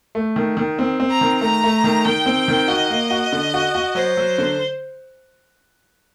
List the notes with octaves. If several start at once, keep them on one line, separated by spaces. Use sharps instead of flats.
A3
D#3
D#3
C4
C4
A#5
D#3
A3 A#5
A3
D#3
D#3 G5
C4
D#3
F#4 D#5
A#3
F#4
D3
F#4
F#4
F#3 C5
F#3
D3